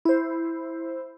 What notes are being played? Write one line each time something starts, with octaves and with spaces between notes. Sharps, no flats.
E4 C5